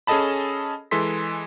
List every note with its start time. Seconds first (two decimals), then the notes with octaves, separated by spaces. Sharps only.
0.07 C#4 G#4 A4 D#5 A5 B5
0.91 E3 G#3 A4 C6 B6